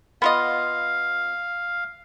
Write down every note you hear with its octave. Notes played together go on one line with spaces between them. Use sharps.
B3 F4 D#5 F5